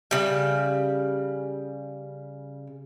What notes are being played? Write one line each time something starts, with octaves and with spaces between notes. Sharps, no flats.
C#3 G3